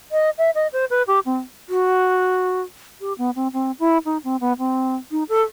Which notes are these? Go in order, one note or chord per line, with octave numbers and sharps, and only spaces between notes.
D#5
E5
D#5
C5
B4
G4
C4
F#4
G4
B3
C4
C4
E4
D#4
C4
B3
C4
D#4
A4